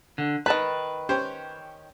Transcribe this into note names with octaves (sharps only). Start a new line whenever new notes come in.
D3
D#3 B4 A5 B5 F#6
C#4 G4 C5